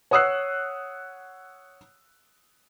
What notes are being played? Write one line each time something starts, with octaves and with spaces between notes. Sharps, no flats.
C#5 F#5 D#6 E6 F#6 C7